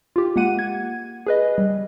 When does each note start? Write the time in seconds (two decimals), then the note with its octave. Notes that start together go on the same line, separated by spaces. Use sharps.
0.16 F4 G4
0.36 G#3 A#3 F#5 D#7
0.59 G#6
1.27 G#4 B4 D#5
1.58 G3